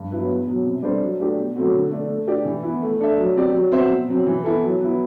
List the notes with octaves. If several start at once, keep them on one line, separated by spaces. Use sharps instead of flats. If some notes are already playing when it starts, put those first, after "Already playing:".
Already playing: G2
F#3 B3 E4 B4
E2
B2 F#3
C3
G3 D4 A4 C5
F#3
A3 D4 G4
B2
F#3 A3 C4 F#4
D3
A3 D4
A3
D4 G4 D5
E3
B3 E4
A3
D4 A4 E5
F#3
C4 G4 D5
F#3
C4 F#4 C5 E5
B2
F#3 C4
E3
B3 E4 A4
F#3
B3 E4